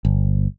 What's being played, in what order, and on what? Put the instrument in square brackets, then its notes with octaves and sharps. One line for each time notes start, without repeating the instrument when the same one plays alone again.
[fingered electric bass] G1